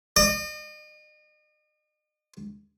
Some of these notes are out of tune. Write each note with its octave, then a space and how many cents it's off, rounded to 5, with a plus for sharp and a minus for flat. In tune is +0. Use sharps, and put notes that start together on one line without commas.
D#5 -40